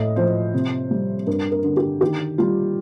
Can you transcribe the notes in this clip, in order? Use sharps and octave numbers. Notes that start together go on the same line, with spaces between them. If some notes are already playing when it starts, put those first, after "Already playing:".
Already playing: A2 D#5
F3 C5
C3
G3
G2 A#4
A#4
D3
G4
D#3 G4
G3 F4